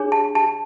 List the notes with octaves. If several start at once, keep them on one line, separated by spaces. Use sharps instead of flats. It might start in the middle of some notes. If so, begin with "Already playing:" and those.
Already playing: D4 G#4 C#5
A5
A5